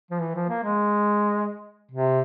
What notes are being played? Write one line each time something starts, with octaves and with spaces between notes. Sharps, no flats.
F3
E3
F3
A#3
G#3
C3